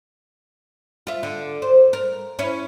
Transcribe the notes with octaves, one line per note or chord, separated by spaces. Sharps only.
F4 E5
D3
C5
A#4
C#4 E4 C#5